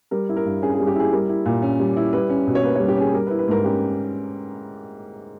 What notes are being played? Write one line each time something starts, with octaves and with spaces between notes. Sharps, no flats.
G3 A#4
E4
A#4
G2
C#4 G#4
G#4
G3
G4
E4 G#4
G3 A#4
E4
A#2
C#4
G3
E4
G3 B4
C#4
B2
C#5
A#3 B4
G3 C#5
G4
C#4 G#4
G3 A#4
B4
E4
B4
G#2 A#4
C#4 G4